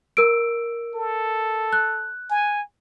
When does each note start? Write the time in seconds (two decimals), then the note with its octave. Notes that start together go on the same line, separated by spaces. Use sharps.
0.17 A#4 E6 D7
0.95 A4
1.73 F#6
2.31 G#5